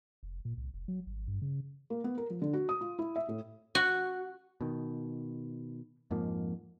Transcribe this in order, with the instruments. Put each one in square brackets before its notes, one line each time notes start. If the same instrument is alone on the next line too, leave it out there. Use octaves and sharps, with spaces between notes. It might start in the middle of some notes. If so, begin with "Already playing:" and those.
[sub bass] F1
A#2
C2
F1
F#3
G#1
G2
C#3
[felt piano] A#3
B3
A#4
F3
D3
F#4
D#6
F4
E4
E5
A2
[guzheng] F#4
[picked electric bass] B2 D#3
F2 G#2 F3 A#3